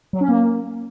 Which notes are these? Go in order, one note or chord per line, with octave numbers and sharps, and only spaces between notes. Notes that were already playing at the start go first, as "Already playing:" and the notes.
F#3
C#4
A#3